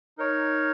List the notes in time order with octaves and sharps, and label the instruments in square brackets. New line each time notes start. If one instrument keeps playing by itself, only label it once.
[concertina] D#4 A#4 C#5